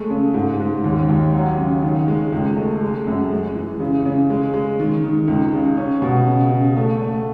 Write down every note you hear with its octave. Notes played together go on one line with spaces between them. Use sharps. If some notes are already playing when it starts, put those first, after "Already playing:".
Already playing: G#3 A3
C#3
G#2
G#2
D#2
D#2
F#3
C#3
D#3
G#3
C#2
A3
G#3
F#2
G#3
E3
C#3
C#3
G#3
G#3
D#3
D#3
C#2
C#3
C#4
B2
C#3
C#3
A3
A3